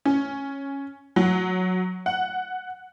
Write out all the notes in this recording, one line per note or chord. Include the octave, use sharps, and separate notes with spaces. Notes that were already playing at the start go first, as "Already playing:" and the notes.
C#4
F#3
F#5